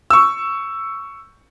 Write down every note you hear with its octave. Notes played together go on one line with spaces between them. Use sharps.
C#6 E6